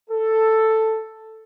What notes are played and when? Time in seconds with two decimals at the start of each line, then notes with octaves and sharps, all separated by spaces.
0.10 A4